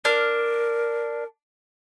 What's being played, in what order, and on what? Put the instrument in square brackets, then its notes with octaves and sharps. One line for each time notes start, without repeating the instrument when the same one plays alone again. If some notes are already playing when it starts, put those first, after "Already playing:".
[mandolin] D4 F6 [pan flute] A#4